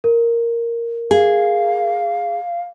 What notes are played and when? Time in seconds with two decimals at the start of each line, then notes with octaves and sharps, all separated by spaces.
0.04 A#4
1.11 G#4 F5